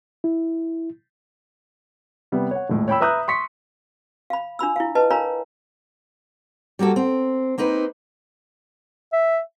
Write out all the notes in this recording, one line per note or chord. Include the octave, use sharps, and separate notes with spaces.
E4
C3 G3 B3
C#5 F#5
D#1 A2 G#3
C#5 G5 B5 E6
B4 E5 A#5 D#6 F#6 G6
C6 C#6 B6 C#7
F5 B5
D4 F4 B5 E6
E4 F5
B4 D#5 A5
A#4 C#5 F5 G#5 A#5 B5
G3 A#3 F#4 A4
C4
A#3 C4 D#4 B4
E5